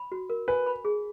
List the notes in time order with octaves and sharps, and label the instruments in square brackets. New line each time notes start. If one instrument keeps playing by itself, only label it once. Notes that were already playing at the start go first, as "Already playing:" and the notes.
Already playing: [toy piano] B5
F#4
A#4
[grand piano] B4 [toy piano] G#5
[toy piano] B5
G#4